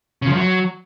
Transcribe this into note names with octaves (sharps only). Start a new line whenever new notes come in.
C#3
F3
F#2
F#3